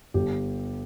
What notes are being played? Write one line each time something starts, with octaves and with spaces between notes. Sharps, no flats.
G1 G4